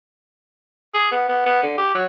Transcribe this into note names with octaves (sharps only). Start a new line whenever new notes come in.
G#4
B3
B3
B3
D3
G4
F#3